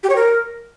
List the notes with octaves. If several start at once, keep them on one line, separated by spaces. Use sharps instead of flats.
G4
C#5
A#4